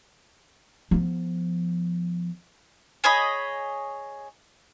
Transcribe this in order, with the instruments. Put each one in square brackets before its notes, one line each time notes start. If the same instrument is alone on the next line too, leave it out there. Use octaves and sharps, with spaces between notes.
[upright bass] F3 B3
[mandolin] G#4 C#5 D#5 B5